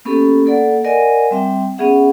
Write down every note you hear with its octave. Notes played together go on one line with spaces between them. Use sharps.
A#3 B3 C#4 G4 A4
A#3 A4 D5 F#5
A#4 D5 D#5 F#5 G#5
G3 C4 E5 G5
B3 C#4 G#4 E5 F#5